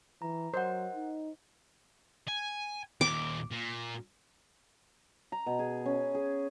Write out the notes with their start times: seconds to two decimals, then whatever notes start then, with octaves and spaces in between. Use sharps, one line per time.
0.22 E3 A#5
0.54 F#3 A#4 C5 D#5 F#5
0.95 D#4
2.28 G#5
3.01 D#2 A#2 D6
3.51 A#2
5.32 A#5
5.47 B2
5.59 G#4
5.85 C#4
6.15 G#4